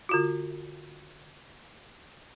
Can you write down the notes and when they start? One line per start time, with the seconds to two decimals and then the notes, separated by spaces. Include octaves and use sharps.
0.09 D3 F4 F#4